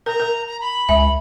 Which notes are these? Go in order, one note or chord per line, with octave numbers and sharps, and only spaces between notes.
A#4 A#5
A#4
A#5
B5
C#2 E5 G#5